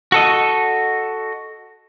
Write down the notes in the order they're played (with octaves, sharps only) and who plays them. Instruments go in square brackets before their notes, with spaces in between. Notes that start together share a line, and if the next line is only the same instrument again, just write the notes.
[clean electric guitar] F#4 A4 D#5